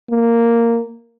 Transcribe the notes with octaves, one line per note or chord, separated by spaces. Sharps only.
A#3